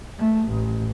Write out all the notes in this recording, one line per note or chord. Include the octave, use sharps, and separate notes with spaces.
A3
A1